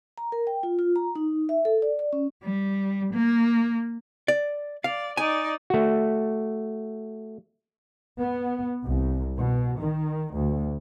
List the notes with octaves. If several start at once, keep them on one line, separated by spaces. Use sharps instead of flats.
A#5
A#4
G5
F4
F4
A#5
D#4
E5
A4
D5
D5
C#4
G3
A#3
D5
D5 F5
D#4 D5 G#5
A3 F#4
B3
C2
B2
D#3
D2